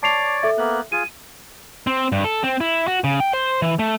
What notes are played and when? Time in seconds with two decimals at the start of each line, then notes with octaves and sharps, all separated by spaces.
0.03 C#5 D5 A5 D6 C7 F7
0.43 A4 E5
0.58 A#3 B3 F#6
0.92 F4 G#4 D#7
1.87 C4
2.12 G2
2.24 A4
2.43 C4
2.61 E4
2.87 F#4
3.04 C#3
3.20 G5
3.33 C5
3.62 E3
3.79 A3